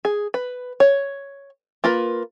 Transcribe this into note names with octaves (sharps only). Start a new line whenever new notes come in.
G#4
B4
C#5
A#3 F4 A#4 B4